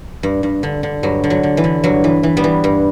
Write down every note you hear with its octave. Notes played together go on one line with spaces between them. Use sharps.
G2
G2
D3
D3
G2 F#3
D3
F#3
D3
E3
D3
G2 F#3
E3
E3
G3 B3
E3
G2